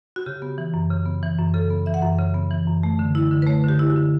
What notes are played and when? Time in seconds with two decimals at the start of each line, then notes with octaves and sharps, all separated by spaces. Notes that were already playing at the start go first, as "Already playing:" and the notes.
0.16 F#4
0.26 C#3 G4
0.42 B3
0.58 E3
0.74 F#2
0.90 C#3
1.06 B3
1.23 E3
1.38 F#2
1.54 C#3 A4
1.70 B3
1.86 E3 E5
1.94 F#5
2.02 F#2 E5
2.18 C#3
2.34 B3
2.51 E3
2.67 F#2
2.83 A3
2.99 D3
3.15 E4
3.31 D3
3.42 B4
3.47 A3 C#5
3.64 D3 G4
3.79 E4
3.90 F#4
3.96 D3